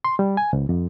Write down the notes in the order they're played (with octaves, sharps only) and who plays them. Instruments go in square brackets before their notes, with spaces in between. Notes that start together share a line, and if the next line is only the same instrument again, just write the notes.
[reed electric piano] C6
G3
G#5
C#2
F2